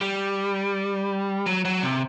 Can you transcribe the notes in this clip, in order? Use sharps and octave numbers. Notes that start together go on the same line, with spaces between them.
G3
F#3
F#3
C3